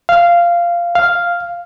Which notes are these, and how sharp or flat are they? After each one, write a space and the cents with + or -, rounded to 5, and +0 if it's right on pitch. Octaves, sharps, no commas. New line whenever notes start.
F5 -15
F5 -5